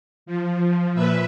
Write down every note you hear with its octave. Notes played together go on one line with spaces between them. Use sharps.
F3
A#2 B4 E5